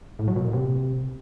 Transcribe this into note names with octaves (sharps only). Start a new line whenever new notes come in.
A2
F#3
B2
A#2
C3